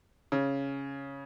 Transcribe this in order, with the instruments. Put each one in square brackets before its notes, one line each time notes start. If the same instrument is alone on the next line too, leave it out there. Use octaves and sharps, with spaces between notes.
[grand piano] C#3